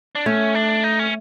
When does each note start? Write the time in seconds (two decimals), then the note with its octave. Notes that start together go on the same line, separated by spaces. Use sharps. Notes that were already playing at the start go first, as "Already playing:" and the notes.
0.15 D4
0.26 A3 C#4
0.55 D4
0.84 D#4
0.99 C#4